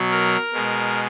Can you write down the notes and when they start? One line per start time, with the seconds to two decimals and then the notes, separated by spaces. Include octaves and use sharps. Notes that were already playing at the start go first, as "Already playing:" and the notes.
Already playing: B2 F#3
0.11 A#4
0.53 B2 G#3